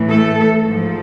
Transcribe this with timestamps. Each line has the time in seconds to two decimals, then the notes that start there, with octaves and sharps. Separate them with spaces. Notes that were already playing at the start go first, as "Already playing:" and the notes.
Already playing: A2 E3
0.09 A3 A4
0.65 G#2 F3